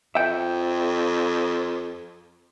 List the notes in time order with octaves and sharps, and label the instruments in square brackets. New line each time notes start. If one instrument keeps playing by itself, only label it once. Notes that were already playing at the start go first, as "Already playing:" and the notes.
[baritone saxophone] F2 [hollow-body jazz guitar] E5 G5